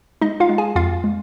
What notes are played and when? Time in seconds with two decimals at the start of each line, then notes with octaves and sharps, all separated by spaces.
0.21 G#3 D#4 D#5
0.40 F4 F5
0.49 G#3
0.58 G#4 G#5
0.76 F2 F4 F5
1.04 G#3